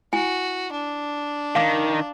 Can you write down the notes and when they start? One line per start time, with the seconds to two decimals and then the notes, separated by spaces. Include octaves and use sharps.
0.13 E4 F#4 G#5
0.72 D4
1.55 D#3 F5 A#5 D6